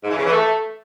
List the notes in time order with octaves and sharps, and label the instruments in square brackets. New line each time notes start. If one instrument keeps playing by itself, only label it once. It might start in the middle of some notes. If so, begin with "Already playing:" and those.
[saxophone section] G#2
E3
C#3
E3
A3